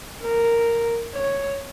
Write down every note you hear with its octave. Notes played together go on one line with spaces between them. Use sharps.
A#4
C#5